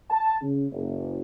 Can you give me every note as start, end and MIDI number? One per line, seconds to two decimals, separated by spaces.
0.10 0.35 81
0.42 0.66 49
0.72 1.21 30